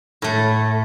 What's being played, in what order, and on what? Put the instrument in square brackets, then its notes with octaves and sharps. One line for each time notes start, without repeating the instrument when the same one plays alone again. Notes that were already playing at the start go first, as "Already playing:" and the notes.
[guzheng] A2 A3